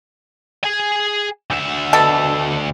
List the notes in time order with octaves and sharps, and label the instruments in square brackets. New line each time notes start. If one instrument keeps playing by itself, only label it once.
[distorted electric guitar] G#4 G#5
D2 E5
[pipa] B2 A4